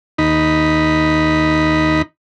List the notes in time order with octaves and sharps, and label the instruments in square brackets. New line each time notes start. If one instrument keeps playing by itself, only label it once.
[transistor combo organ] D#2 D#4 B5